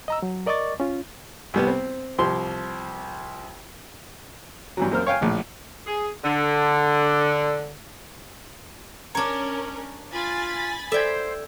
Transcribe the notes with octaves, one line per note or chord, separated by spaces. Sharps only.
D#5 A#5 E6
F#3
A#4 D5 D#5 C#6 D6 A6
C#4 F4
C2 G3 B3
C4
C2 F3 G4 C6
G2 E3 F#3
F#2 A#3 C5 F6
C#5 F5 G5 G#5
A#1 A2
G#4
D3
C#4 D4 A#4 C#5 A#5
F4 G#5 B5 A6
A4 C5 D5 E5 G5 G#6